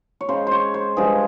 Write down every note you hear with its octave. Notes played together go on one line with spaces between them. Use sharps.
C#5
C#3 G#3 C5
C5 C#5
C5
G2 F3 G#3 G#4